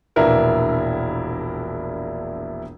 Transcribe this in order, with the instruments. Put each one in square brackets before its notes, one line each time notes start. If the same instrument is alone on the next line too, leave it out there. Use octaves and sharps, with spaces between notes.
[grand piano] E1 A#1 D4 E4 A#4 B4